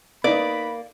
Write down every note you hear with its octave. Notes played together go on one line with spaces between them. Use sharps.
A#3 B3 D#4 D5 B5